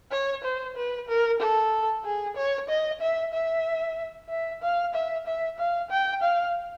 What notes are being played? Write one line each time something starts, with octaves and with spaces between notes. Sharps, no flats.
C#5
C5
B4
A#4
A4
G#4
C#5
D#5
E5
E5
E5
F5
E5
E5
F5
G5
F5